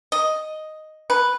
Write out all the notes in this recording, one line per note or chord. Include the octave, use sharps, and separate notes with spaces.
D#5
B4